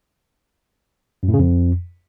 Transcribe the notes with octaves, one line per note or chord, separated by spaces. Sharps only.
F#2
A2
C#3
F2